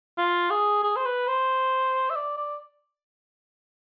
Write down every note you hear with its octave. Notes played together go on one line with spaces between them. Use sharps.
F4
G#4
G#4
C5
B4
C5
E5
D5
D5